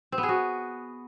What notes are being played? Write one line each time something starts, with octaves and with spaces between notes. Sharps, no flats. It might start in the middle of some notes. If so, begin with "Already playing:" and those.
C4
B3
G#4
F#4